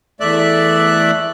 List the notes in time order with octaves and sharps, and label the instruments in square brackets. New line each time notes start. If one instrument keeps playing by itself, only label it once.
[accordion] E2 A3 D5 E5 F#6